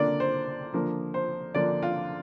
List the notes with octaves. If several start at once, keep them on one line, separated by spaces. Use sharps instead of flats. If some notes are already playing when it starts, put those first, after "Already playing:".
Already playing: D3 A#3 D4 D5
C5
D3 F3 A#3 D4
C5
D3 F3 A#3 D4 D5
F4